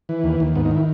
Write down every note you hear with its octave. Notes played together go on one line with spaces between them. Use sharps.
E3
D#2
D#2
G#2 B3
D#4
D#3
E4